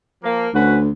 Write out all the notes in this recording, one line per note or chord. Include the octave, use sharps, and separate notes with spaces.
F3 A#3
D2 C#4 F#4 B4